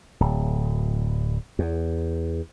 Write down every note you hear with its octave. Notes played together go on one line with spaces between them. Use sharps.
D1
E2